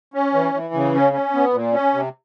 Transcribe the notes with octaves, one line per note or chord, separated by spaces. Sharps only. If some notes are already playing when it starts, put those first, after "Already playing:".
C#4
E3
E3
C#3
C#4
C#4
B3
A#2
C#4
C3